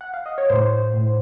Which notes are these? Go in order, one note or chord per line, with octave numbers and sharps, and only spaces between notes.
F#5
F5
D#5
C#5
A2 C5
A2